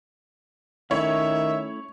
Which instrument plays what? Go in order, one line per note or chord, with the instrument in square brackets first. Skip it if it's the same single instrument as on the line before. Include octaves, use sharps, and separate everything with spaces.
[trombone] D#3 [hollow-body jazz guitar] A3 C#4 E4 [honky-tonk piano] C#5 [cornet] E5